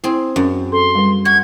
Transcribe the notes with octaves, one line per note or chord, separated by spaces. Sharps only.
C4 E4 G#4
F#2 C#4
A4 C6
G3 B4
F#4 G#6